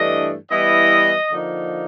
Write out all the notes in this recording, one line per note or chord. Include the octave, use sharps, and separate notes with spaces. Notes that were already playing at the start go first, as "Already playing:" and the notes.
Already playing: G2 E3 A3 D4 D#5
E3 G3 B3 E4 D#5
D3 F3 A#3 D#4